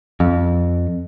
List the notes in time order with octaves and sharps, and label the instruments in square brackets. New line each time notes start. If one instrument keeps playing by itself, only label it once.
[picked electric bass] F2